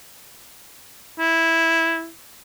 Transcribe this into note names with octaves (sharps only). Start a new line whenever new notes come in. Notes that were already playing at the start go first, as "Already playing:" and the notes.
E4